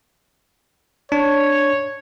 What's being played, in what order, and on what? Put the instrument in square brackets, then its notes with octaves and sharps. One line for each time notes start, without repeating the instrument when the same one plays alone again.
[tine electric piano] D4 [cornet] C#5